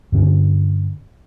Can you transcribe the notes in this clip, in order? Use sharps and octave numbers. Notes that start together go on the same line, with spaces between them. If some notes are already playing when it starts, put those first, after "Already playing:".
G2 D3 C4 C#4